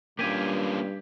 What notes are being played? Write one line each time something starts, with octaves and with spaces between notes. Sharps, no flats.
G2 A#3 C#4 F4 G4 G#5